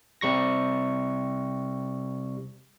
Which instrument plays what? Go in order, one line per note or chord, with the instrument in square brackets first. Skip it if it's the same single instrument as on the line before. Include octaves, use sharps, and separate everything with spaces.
[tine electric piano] C3 G3 C#6 A#6